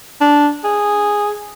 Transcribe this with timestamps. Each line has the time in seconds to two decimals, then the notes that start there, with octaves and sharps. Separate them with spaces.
0.21 D4
0.64 G#4